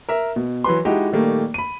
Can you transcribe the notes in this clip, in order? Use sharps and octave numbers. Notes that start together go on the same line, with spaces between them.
A#4 E5
B2
E3 F#3 B4 C6
G#3 D#4 E4 F#4 G4
A#2 D#3 G3 A3 A#3
B5 D#7